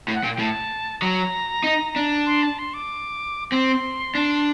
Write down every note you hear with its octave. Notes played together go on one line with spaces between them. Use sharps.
A2
F#5
A#2 G5
G5
A2 A5
F#3 A#5
D#4
D4
C6
A5
C6
D6
C4 C6
D4